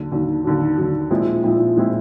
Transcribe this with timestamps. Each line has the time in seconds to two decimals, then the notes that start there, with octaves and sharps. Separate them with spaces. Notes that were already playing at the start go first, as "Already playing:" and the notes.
Already playing: D#2 D3 F#3
0.11 D#2 D3 F#3
0.44 D#2 D3 F#3
0.78 D#2 D3 F#3
1.11 A#2 F3 G#3 C4 E4
1.43 A#2 F3 G#3 C4 E4
1.76 A#2 F3 G#3 C4 E4